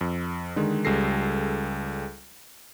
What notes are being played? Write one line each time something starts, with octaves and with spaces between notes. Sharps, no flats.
F2
D3 D#3 G#3
C#2 G3 G#4 A4 A#6 C7